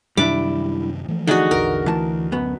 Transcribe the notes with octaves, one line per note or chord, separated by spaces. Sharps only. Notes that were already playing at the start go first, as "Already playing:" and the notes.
F#2 C3 D#3 G3 D4 E4 D6
E3 F3 A3
D3 D4 D#4 F#4 G#4
A#1 E2 A#4
D2 E3 A5
F#2 B3